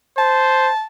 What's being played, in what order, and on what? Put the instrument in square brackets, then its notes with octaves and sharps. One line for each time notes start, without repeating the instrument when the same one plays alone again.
[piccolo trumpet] C5 [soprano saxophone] A5